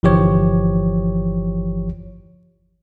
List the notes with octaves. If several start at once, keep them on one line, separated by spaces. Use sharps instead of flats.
G1 E3 F3 G4 C#5